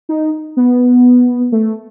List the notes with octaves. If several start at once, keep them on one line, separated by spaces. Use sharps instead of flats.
D#4
B3
A3